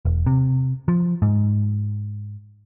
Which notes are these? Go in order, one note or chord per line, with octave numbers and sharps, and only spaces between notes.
E1
C3
F3
G#2